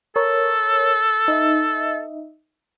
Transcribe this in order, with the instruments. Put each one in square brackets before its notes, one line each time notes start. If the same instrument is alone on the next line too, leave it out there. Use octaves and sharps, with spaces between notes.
[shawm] A4 [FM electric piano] A#4 C#5
[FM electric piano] D#4 D#5 E5